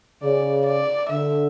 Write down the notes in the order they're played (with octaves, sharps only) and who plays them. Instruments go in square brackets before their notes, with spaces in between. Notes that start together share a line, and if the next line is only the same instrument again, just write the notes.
[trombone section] C#3 [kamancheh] D5
[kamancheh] D5
[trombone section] D3 [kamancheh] E5